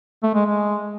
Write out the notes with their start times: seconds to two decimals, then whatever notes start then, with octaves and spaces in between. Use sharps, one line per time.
0.23 A3
0.34 G#3
0.45 G#3